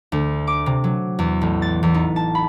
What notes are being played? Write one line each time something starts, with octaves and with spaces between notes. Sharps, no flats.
D2
D6
C3
F#3
E2
A1
A6
E2
D#4
A5
B5